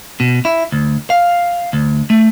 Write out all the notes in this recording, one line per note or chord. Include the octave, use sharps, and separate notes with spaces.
B2
E4
D2
F5
D2
A3